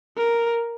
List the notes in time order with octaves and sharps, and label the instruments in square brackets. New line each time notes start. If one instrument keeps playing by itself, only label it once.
[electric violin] A#4